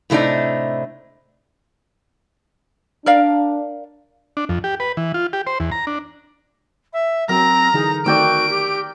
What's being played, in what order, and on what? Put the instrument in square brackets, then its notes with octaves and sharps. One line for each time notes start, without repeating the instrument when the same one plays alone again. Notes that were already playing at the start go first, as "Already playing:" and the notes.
[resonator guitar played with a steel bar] A2 C3 A3 D4 D#4
[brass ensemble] D4 [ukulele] A#4 D5 F5
[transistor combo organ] D4
F2
G4
B4
E3
F4
G4
C5
E2
A#5
D4
[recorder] E5
[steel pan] F#3 [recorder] C4 [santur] A#4 [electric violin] A#5
[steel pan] D3 E3 G#4 [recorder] D#4
[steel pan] D#3 A3 C4 [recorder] F#4 [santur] D5 G5 E6 [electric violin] D7
[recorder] G4